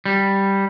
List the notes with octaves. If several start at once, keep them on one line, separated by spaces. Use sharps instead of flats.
G3